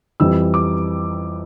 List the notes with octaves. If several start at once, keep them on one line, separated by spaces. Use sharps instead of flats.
F2 E3 G3 E6
D6